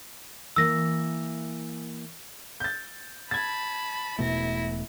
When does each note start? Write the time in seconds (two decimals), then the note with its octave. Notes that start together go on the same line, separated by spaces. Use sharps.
0.56 E3 A#3 E6 A#6
2.60 G6 A6
3.31 A5 B5 G#6 A6
4.19 E1 B2 A3 E4 A#6